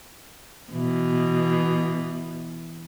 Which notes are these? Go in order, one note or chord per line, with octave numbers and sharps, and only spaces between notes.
B2 E3